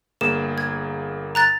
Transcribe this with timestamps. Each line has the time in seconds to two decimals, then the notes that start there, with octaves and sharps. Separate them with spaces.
0.21 G1 A#3 G#4 E7
0.58 G#6
1.35 A#5 F#6 A6